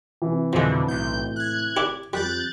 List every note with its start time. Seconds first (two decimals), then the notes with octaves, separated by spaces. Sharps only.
0.22 C3 E3
0.53 F2 B2 D3 F3 G#3
0.88 B1 A2 G6
1.36 F#6 G#6
1.76 E4 G4 D5
2.13 F2 G3 F#6 G6 A6